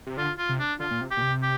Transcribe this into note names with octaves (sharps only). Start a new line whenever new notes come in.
C3
D3 F4
F4
C3
D4
D3 F4
A#2
C3
G4
A#2
C3
G4